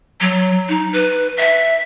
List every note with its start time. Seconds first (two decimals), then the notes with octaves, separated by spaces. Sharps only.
0.21 F#3
0.69 D#4
0.93 B4
1.37 E5